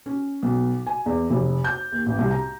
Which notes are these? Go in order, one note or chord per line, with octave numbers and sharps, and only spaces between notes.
C#4
B1
G#5
E2
F1
G6
D#2
A1
C2
A#5